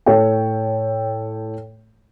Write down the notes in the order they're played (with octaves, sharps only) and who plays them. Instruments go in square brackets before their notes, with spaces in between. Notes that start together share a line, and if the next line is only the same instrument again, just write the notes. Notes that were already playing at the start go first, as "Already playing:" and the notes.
[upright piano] A2 A4 C#5 G5